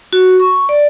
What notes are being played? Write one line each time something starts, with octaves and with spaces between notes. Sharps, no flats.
F#4
C#6
D5